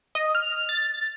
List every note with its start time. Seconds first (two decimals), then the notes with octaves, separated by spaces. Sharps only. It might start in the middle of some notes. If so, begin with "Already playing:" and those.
0.15 D#5
0.35 F6
0.69 A6